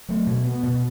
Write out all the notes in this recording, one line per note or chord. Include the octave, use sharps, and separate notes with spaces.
F#3 A3
B2
B3
B2